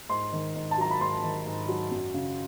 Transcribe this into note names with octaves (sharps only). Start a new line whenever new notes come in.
G#2 C6
D#3
G#2
A5
F#3 A#5
B5
G#2 C6
D#3
G#2
F#3
F#2
C#3